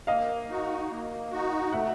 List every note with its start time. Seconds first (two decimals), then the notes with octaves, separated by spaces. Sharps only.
0.07 A#3 D#5 F5
0.49 D#4 F#4
0.90 A#3
1.31 D#4 F#4
1.72 A3 E5 F#5